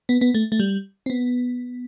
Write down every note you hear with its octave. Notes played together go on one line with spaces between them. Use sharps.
B3
B3
A3
A3
G3
C4
B3